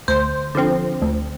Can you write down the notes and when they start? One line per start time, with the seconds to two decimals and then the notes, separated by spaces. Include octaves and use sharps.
0.08 D2 C5
0.55 D3 F3 C4
1.02 D2